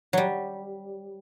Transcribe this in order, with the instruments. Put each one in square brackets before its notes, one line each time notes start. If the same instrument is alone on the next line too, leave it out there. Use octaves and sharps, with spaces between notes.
[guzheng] F#3 G3